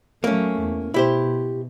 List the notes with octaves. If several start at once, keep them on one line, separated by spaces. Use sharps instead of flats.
F#3 A3 A#3 C#4
E2
B2 E4 G4 C5